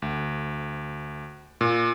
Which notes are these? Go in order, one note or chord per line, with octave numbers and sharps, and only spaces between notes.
D2
A#2